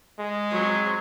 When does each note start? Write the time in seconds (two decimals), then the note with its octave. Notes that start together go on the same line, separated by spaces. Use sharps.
0.19 G#3
0.51 F#3 C4